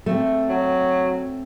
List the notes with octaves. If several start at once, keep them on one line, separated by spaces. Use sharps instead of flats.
A3 C4
F#3